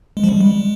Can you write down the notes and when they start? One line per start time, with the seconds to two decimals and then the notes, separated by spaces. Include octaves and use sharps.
0.17 G#3
0.24 F3
0.29 G3
0.41 G#3